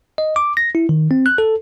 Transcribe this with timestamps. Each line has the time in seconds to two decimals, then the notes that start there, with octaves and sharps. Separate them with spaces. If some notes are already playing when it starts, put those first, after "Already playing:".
0.18 D#5
0.36 D6
0.57 A#6
0.75 E4
0.89 D#3
1.11 C4
1.26 F#6
1.38 A4